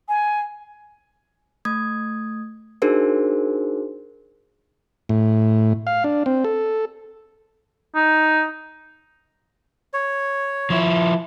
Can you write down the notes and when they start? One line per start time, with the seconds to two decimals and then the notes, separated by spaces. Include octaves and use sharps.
0.08 G#5
1.65 A3 D#6 G#6
2.82 D4 D#4 F#4 G#4 A#4 C5
5.09 A2
5.87 F5
6.04 D4
6.26 C4
6.44 A4
7.95 D#4
9.93 C#5
10.70 F3 E4